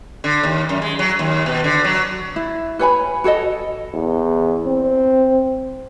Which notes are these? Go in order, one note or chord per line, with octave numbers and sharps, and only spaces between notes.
D3
D#2
F#2
G#3
F#3
D#2
B2
D3
F#3
E4
B4 C#5 G#5 B5
F#4 A4 C#5 D#5
E2
C4